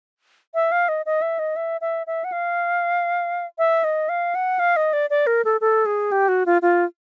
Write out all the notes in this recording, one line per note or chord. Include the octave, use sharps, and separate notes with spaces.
E5
F5
D#5
D#5
E5
D#5
E5
E5
E5
F#5
F5
E5
D#5
F5
F#5
F5
D#5
D5
D5
A#4
A4
A4
G#4
G4
F#4
F4
F4